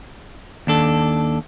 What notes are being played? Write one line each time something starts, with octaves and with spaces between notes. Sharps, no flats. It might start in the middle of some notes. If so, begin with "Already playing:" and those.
D#2 D4 A4